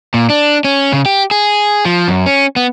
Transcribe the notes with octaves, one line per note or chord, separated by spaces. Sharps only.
A#2
D4
C#4
C#3
G4
G#4
F3
F#2
C#4
B3